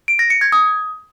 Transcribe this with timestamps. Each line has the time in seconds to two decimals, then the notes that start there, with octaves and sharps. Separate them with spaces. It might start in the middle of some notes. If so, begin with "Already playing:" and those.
0.08 D7
0.19 A#6
0.30 C#7
0.41 G#6
0.52 D#6